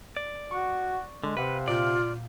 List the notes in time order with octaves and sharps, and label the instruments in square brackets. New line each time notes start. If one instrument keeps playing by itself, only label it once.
[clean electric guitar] D5
[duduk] F#4 [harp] C#6
[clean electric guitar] D3 [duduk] G#3
[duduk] C3 [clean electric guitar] B4 [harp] F5 F#5
[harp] A#2 D6 G6 [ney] F4 [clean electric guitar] D5